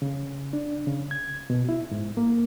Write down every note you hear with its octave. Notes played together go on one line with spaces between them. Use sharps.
C#3
D4
C#3
G#6
B2
E4
G#2
A#3